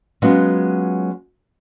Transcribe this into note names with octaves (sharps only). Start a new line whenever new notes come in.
F#3 G#3 B3 C#4 F4